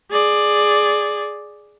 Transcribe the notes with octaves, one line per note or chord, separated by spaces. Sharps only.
G#4 D5